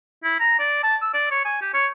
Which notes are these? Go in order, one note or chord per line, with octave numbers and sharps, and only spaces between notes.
E4
A#5
D5
A5
E6
D5
C#5
G#5
G4
C#5